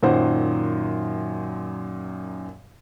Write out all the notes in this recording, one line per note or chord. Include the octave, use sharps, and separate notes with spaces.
F#2 A#2 D#3 F#3 C5 F#5